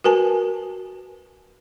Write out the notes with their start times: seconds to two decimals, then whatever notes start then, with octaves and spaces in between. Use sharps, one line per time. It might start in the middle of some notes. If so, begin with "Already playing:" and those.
0.04 F#4 A#4 B4 G#5 A5